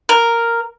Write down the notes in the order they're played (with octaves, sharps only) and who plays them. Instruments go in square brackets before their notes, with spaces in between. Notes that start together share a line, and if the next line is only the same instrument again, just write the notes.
[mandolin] A#4